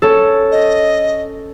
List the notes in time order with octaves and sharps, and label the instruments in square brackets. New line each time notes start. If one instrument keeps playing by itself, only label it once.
[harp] C#4 A4
[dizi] D#5